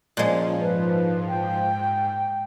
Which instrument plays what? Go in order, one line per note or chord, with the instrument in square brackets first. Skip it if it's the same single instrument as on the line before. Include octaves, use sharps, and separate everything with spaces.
[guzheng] A#2 G#3 [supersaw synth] F3 [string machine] C#4
[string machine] G#2 [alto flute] B4
[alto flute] G5